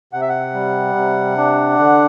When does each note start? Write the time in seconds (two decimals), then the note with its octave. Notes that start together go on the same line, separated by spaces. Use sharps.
0.13 C3 F#5
0.21 E5
0.29 F#5
0.54 G3
0.95 C3
1.37 D4
1.79 D3